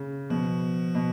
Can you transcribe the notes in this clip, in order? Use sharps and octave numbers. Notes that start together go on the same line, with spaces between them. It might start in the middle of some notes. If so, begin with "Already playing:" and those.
Already playing: C#3
B2 F3
B2